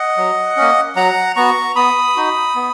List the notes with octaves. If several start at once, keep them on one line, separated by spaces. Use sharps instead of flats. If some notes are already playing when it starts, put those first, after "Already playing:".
Already playing: D#5 F#5
F#3
A#3 C#4
F#3 F#5 A#5
B3 F#4 A#5 C#6
B3 B5 D#6
D#4 F#4
B3